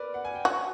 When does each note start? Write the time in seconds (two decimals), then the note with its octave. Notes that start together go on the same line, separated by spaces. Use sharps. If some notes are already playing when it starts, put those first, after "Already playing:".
Already playing: A#4 B4 D5
0.14 F#5
0.25 G#5
0.35 G5
0.45 F#4 F#5